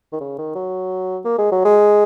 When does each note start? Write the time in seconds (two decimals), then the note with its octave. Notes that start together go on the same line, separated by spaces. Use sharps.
0.13 D#3
0.21 C#3
0.38 D#3
0.55 F#3
1.25 A#3
1.38 G#3
1.52 F#3
1.65 G#3